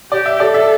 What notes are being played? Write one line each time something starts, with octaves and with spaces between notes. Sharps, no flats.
G4 D5
E5
A4 D5
E5